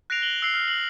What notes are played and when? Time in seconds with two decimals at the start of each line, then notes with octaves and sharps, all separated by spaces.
0.10 F#6 A#6 C7 D7 F7
0.22 F#7 G7
0.42 E6 F#6 C7
0.54 F6
0.68 F#7